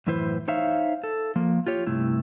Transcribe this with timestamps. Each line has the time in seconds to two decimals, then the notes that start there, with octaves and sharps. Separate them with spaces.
0.07 F#2 A2 E3 E4 B4 C5
0.48 D#4 C5 C#5 E5 F5
1.03 A4
1.36 F3 A#3
1.67 F4 G4 C#5
1.87 G2 C3 A3 E4